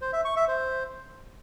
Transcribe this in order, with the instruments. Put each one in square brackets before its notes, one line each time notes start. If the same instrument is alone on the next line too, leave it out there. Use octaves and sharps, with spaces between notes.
[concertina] C5
E5
C#6
E5
C5